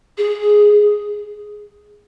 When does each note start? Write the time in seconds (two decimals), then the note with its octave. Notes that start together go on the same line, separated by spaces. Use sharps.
0.18 G#4